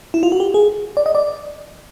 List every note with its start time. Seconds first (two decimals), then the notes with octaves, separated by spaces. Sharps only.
0.14 E4
0.23 F4
0.32 F#4
0.40 G4
0.54 G#4
0.97 D5
1.06 D#5
1.15 D5